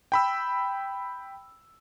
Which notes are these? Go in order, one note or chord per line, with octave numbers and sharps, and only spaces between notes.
G5 B5 E6